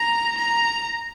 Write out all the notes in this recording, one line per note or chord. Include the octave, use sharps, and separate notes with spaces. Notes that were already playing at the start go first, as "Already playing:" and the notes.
Already playing: A#5
A#5